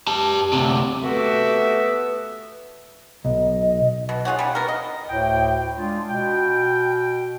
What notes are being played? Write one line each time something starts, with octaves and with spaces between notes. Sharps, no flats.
G4 A5
D2 C3
A3 B3 F#4 G4 E5
B1 D#5
B2
F4 G#4 C#5 F#5
G3 C#4
B3 A#4
D#5
D2 A2 G5
G#3 D4 F4
B2 G5